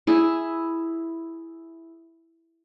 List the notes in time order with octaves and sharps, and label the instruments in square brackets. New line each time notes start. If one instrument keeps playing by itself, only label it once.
[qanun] E4 G#4